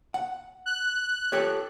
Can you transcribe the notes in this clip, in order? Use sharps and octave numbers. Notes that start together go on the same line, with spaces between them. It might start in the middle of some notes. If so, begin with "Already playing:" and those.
F#5
F#6
G4 A4 C#5